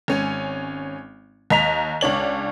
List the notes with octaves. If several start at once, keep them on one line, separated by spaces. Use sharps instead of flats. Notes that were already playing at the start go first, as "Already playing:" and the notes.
G#1 C#4 G#5
D#2 D#5 A#5 B6 F7
C#2 D4 C#5 F#7